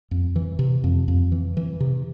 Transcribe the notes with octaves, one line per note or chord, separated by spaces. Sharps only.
F2
E3
C3
F2
F2
E3
E3
C3